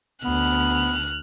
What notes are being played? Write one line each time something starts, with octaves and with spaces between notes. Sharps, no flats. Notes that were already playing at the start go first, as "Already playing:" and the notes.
D2 B3 F6 F#6